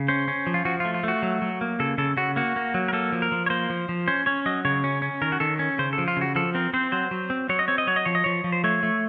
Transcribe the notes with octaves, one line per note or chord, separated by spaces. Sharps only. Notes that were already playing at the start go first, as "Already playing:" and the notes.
Already playing: C#3
C#4 C5
C#4
F3
F4
F3 F#4
A3 F4
F4
A3 F#4
F#3
F#3
A#3
C#3 A4
C#3 A4
C#3 F#4
A#3 F#4
A#3
F#3
A#4
A#3 A4
F3
A#4
F3
C#5
A#3 C5
F3
F3
C#4 C5
C#4 C#5
F#3 D#5
C#3 C#5
C#4
C#4
D#3 A#4
F#4
D#3 A4
C#4
C#3 C5
A4
F3
F4
C#3 F#4
F3 A4
C4 A#4
C4 C5
F#3 C5
F#3
C4
F#3 C#5
D#5
C4 C#5
D#5
F#3 C#5
D#5
F3 C#5
D#5
F3 C#5
F3
C5
A3 C#5
A3